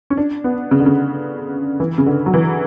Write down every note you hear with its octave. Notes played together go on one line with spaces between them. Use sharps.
C#4
D4
B3
C#3
D3
C#3
E3
C#3
D3
F#3
E3